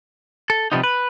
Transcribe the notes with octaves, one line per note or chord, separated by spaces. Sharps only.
A4
C3 D#3 F3 G3 B3 D#4
B4